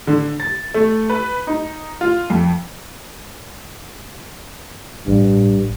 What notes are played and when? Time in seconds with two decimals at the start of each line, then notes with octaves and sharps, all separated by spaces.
0.07 D3
0.40 A6
0.74 A3
1.10 B4
1.47 D#4
2.01 F4
2.30 F2
5.07 A1 G2